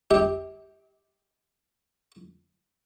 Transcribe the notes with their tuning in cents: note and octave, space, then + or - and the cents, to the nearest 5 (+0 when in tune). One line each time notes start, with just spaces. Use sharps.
G4 +0 E5 -40